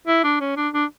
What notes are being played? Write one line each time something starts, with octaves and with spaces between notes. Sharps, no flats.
E4
D4
C#4
D4
D4